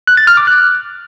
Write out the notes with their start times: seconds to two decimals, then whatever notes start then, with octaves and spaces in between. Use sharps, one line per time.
0.07 F#6
0.17 A6
0.27 F6
0.37 D6
0.47 F#6